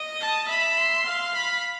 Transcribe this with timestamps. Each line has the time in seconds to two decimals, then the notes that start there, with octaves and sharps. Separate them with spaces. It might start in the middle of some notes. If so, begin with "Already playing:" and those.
Already playing: D#5
0.20 A5
0.48 E5 B5
0.77 C6
1.06 F5
1.34 B5